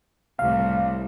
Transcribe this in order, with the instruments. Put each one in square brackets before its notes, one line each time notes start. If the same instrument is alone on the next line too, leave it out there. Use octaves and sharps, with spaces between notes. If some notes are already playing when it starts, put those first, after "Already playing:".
[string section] C2 A2 [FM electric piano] F5